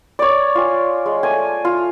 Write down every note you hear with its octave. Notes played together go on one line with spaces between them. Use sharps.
C#5 D5
F4 G#5
G#3
A3 G#5 D6
F4